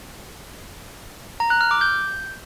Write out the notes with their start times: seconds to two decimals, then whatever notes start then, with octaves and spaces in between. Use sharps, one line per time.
1.40 A#5
1.50 F#6
1.61 F6
1.71 D6
1.81 G6